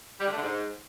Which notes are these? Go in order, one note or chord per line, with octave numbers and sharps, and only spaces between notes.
G3
D3
A3
D3
G#2